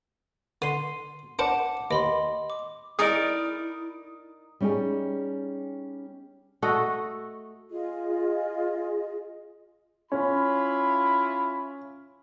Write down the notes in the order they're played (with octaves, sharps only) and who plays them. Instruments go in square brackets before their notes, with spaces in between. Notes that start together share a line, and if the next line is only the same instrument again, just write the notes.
[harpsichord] D3 [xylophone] C6 C7 D#7
[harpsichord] D4 A#4 C5 [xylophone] F#5 A5 D6
[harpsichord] D#2 [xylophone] D#5 B5 C6
[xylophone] D6
[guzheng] D#4 A#4 D5 [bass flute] E4 [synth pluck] G#4 D#5 [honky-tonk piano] D#6 D7
[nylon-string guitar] G3 C#4 D#4 G4 G#4
[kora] A3 F#4 A4 D#5
[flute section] F4 G#4 D#5
[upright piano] C#4 [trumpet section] E4 F4 B5